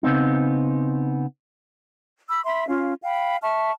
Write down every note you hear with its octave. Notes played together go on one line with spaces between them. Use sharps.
C#3 B3 C4 D#4
B5 E6
E5 B5 C6
C#4 F4 F5
F5 G5 B5
E5 A5 C#6 F6